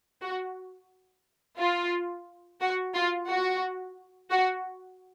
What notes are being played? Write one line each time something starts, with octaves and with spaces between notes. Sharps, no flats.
F#4
F4
F#4
F4
F#4
F#4